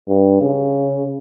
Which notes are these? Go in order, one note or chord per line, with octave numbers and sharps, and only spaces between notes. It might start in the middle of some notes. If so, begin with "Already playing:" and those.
G2
C#3